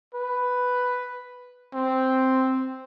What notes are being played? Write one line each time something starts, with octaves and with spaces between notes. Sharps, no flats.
B4
C4